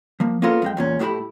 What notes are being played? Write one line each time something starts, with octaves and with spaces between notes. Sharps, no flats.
F3 A#3
A#3 B3 C#4 F4 A4 A#4
F2 G#3 G5
E2 A#2 C#4
A2 F#3 A3 E4 G4 B5